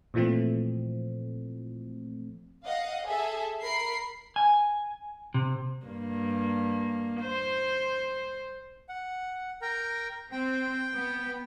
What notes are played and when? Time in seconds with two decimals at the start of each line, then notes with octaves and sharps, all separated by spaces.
0.14 A#2 E3 F3 A3 C4
2.65 D#5 F5 F#5
3.06 G#4 A4 E5
3.63 A#4 B5 C7
4.36 G#5
5.34 C3
5.86 G2 A#3
7.21 C5
8.89 F#5
9.62 A#4 G5 A#5
10.32 C4 G5
10.94 B3